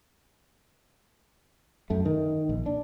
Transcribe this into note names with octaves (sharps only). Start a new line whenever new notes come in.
F#2 A3
D#3
A#1
D4